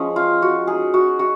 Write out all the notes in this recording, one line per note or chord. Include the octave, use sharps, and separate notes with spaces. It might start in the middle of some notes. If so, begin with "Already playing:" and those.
Already playing: F3 G#3 C#4 G#4
F4
F#4
G#3 D#4 G#4
F#4
F#4